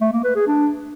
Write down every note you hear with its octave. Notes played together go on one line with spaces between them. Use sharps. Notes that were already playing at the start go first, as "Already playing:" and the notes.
A3
A#3
B4
G#4
D4